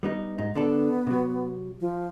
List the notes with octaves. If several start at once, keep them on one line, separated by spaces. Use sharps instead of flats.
G3 B3 D#4
G#2 D#4
D3 B3 D4 A4
C3 F#3
F3